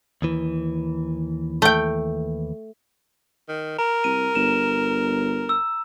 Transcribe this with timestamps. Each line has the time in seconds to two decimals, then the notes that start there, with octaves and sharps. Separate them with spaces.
0.22 D#2 E3
1.62 A3 G5
3.49 D#3
3.79 A#4 A#5
4.04 C2 D#7
4.35 G1 E7
5.49 E6